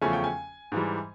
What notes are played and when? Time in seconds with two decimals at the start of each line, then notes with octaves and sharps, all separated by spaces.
0.01 E2 C#3 F3 A3 C#4 G#5
0.13 G5
0.24 G#5
0.72 G#2 E3 G3